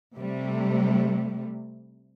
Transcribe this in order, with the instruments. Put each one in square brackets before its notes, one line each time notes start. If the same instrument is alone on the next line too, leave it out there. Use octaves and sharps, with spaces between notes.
[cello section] C3 G3 A3